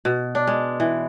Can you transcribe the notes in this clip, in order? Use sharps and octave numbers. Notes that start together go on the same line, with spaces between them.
B2
D4
G#3
E3